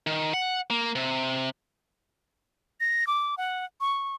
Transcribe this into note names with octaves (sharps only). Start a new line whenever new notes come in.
D#3
F#5
A#3
C3
A#6
D6
F#5
C#6